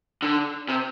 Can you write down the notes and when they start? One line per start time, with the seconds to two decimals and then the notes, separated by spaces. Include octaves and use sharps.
0.22 D3
0.69 C3